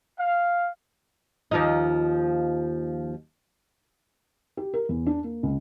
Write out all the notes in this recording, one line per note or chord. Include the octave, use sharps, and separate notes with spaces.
F5
D#2 F3 D#4
G4
A#4
E2
D4
A#3
C#2